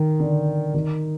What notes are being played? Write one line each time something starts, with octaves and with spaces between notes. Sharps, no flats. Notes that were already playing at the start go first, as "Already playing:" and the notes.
Already playing: D#3
D3
D#3